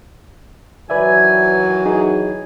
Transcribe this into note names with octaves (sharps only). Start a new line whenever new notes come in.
D#3 E3 F#3 B4 D5 E5 G#5
D#4 G#4